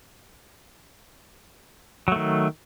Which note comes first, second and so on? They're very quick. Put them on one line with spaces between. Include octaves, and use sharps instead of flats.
F#3 A3 D#3